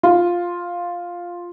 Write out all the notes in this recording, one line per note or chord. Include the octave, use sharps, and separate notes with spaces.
F4